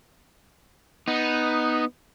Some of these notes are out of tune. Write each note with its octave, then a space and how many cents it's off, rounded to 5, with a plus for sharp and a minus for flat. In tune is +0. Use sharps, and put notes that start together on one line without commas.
B3 +0 D#4 +0